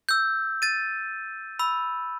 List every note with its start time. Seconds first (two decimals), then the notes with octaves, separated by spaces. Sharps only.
0.09 E6 G6
0.62 A6 D#7
1.59 B5 E6